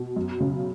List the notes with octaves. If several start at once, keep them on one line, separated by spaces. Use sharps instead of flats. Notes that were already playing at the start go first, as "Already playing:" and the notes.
Already playing: B2
F#2
C#3